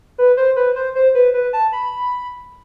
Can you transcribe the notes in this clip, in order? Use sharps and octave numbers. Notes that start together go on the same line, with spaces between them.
B4
C5
B4
C5
C5
B4
B4
A5
B5